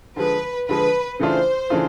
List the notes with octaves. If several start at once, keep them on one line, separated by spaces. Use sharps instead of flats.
D3 F3 G#3 B4
D3 F3 G#3 B4
C#3 E3 A3 D4 F4 C5
C#3 E3 A3 D4 F4